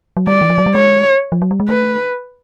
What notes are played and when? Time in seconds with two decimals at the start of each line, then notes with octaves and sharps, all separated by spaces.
0.17 F#3
0.27 G3 D5
0.41 E3
0.50 F3
0.58 F#3
0.66 G3
0.75 G#3 C#5
1.32 F3
1.42 F#3
1.51 G3
1.60 G#3
1.69 A3 B4